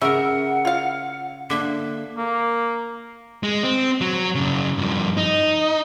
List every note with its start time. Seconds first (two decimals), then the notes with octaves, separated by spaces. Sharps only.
0.02 C#3 A#4 E5 F#5
0.65 F4 F5
1.50 D3 A#3 E5
2.17 A#3
3.43 G#3
3.64 C4
4.01 F#3
4.35 F#2 C#3
4.78 G2 F3
5.17 D#4